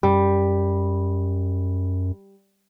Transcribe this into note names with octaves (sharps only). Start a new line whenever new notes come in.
F#2 G3